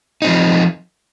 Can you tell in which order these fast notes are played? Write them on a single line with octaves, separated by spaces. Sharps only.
D#4 C4 F3